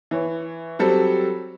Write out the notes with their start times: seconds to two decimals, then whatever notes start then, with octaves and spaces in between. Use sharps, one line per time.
0.11 E3 C#5
0.79 F#3 G3 C4 A4